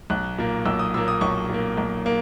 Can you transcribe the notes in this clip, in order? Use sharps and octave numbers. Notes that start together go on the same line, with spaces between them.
B1 F#6
A#2 A#3
B1 E6
D#6
A#2 A#3 E6
D#6
B1 C#6
A#2 A#3
B1
A#3